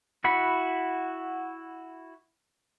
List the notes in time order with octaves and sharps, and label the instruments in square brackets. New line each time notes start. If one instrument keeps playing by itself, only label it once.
[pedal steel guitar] E4 F#4 F#5 B5